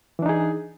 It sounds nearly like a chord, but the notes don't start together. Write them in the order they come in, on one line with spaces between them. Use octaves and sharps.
E3 D4 D#4 G#4